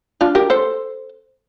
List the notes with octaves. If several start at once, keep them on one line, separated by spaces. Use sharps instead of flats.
D4 F4
G4 A#4
A4 C5